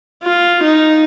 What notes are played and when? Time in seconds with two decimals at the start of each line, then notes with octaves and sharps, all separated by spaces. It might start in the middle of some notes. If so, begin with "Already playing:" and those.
0.24 F4
0.63 D#4